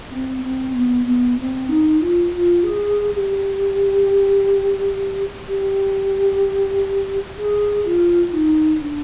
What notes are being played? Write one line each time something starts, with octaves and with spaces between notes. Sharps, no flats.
C4
C4
B3
B3
C4
D#4
F4
F4
G#4
G#4
G4
G4
G#4
F4
D#4
D4